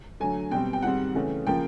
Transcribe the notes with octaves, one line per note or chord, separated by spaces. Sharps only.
D3 F#3 A3 G#5
B2 G3 C4 G5
G5
G#2 D#3 G3 C4 F#5
C#3 E3 A3 C#4
C#3 F3 A#3 G5